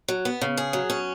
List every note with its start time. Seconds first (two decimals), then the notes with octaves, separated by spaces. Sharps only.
0.08 F#3
0.25 B3
0.41 C#3
0.57 G#4
0.73 F#3
0.90 C#4